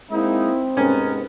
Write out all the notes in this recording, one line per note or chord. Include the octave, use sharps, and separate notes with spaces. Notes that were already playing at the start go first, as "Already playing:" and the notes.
G#3 A#3 C4 D#4 E4
G#2 C3 B3 C#4 A#4